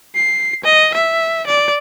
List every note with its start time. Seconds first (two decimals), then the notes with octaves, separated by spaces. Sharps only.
0.15 C7
0.64 D#5
0.95 E5
1.47 D5